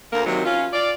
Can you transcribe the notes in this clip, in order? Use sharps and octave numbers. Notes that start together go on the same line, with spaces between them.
D2 A#3
D#2 C3 D#3 F#3
C#4 F4
F4 D5